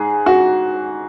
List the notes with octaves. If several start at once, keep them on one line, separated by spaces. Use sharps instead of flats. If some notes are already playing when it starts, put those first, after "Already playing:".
Already playing: G#2 G#4
F#4